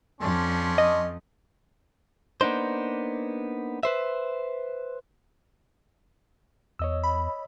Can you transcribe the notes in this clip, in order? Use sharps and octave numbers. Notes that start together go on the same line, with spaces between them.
F2 C#4 D4 C6
D#5
A#3 B3 D4 D#4 C5
B4 C5 E5
E2 C#5 D#5 E6
B5